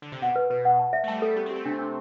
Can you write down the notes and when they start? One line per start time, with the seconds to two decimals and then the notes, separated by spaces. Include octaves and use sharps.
0.02 D3
0.12 C3
0.22 B2 F#5
0.36 B4
0.50 B2 B4
0.65 F#5
0.79 A5
0.93 E5
1.04 A3
1.08 G3 A5
1.22 A3 A4
1.36 B3 G4
1.46 C4
1.51 A3 G4
1.66 C3 D4
1.79 D4